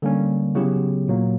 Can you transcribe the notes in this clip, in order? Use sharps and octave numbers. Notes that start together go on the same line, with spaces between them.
D3 G3 A#3 C#4
C#3 F#3 B3 E4 G4
A#2 F#3 A#3